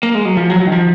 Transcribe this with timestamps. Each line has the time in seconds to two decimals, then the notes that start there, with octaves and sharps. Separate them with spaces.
0.03 A#3
0.15 G#3
0.25 F#3
0.37 F3
0.50 F#3
0.60 F#3
0.66 D#3
0.72 F3